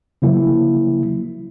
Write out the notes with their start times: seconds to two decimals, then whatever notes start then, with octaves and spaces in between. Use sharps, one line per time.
0.22 C#3 F3 F#3 A#3 E4